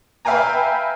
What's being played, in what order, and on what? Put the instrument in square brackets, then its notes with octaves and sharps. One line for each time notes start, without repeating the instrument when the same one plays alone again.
[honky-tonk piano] B4 E5 F5 G5 G#5 A#5